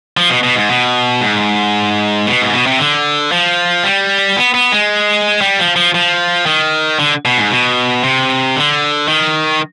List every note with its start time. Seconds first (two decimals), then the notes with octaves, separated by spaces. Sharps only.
0.17 F3
0.30 B2
0.43 B2
0.56 G#2
0.69 B2
1.21 G#2
2.27 B2
2.41 G#2
2.53 B2
2.66 C3
2.79 D3
3.32 F3
3.84 G3
4.37 B3
4.54 B3
4.72 G#3
5.41 G3
5.59 F3
5.76 F3
5.94 F3
6.46 D#3
6.99 D3
7.25 B2
7.38 G#2
7.51 B2
8.04 C3
8.56 D3
9.08 D#3